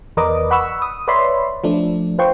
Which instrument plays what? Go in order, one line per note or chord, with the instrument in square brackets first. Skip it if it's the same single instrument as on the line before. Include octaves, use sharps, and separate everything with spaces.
[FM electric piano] E2 A#4 B4 D5 D#5 D6
F#5 B5 C#6 E6
D#6
B4 C#5 D5 E5 B5 C6
F3 A3 D4
F4 B4 C5 G5 C6 C#6